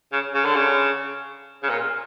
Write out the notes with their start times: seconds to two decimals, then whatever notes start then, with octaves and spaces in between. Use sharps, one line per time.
0.12 C#3
0.34 C#3
0.45 D3
0.56 C#3
1.63 C#3
1.69 A#2